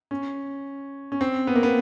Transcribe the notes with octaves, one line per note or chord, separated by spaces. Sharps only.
C#4
C#4
C4
B3
A#3
B3